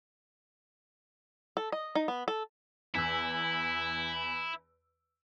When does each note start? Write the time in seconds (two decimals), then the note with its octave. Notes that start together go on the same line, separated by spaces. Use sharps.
1.57 A4
1.72 D#5
1.95 D#4
2.08 B3
2.28 A4
2.95 E2 E4 E6